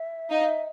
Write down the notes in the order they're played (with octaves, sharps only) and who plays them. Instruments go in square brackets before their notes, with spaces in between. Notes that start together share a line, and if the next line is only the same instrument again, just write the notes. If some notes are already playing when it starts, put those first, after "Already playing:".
Already playing: [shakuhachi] E5
[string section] D#4 [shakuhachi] F5
[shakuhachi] E5